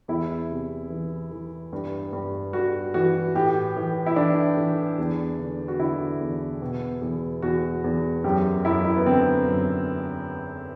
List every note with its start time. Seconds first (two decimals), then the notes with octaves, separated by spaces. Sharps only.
0.08 E2 E4
0.50 C3
0.90 E3
1.31 E3
1.73 G2
2.13 G2
2.53 G2 F#4
2.94 E3 F#4
3.35 A2 G4
3.76 E3
4.06 E4
4.16 E3 D4
4.57 E3
4.98 E2
5.39 D3
5.68 F#4
5.80 D3 E4
6.20 E2
6.62 B2
7.01 E2
7.42 E2 F#4
7.84 E2
8.24 F#2 G4
8.65 F#2 E4
8.85 E4
8.96 B3
9.06 D3 C4
9.47 F#2